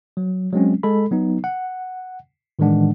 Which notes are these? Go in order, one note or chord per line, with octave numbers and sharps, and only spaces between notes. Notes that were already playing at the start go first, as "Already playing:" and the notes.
F#3
F#3 G#3 C4 C#4
G#3 A4 B5
F#3 B3 D#4
F#5
A2 D#3 E3 G#3 D4 F#5